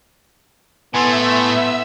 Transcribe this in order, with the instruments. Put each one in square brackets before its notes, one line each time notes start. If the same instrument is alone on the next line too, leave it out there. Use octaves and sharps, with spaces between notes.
[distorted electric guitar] A2 A3 [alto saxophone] B3 [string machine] E5 E6 [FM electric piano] G#5 C6